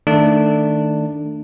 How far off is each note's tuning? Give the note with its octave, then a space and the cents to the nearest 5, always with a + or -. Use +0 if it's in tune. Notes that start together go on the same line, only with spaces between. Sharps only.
D#3 +0 A3 +15 D4 +10